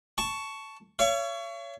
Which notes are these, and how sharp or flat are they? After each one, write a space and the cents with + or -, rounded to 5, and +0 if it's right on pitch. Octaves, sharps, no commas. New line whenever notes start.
A5 +0 C#6 +10
C#5 +20 E5 +45